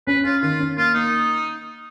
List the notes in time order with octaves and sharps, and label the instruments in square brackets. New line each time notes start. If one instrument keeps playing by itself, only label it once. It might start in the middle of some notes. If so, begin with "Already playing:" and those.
[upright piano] C#4 [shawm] B4
[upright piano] C#4 [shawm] F4
[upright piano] D#3 [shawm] F4
[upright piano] C#4
[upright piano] A#3 [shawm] F4
[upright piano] A#3 [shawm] D#4